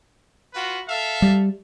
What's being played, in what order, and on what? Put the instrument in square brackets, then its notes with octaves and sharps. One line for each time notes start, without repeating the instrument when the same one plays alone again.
[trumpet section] F4 F#4 B4
A4 E5 F5
[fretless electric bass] G3